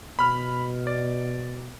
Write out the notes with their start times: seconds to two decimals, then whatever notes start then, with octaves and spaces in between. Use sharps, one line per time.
0.19 B2 B5 F6
0.87 D5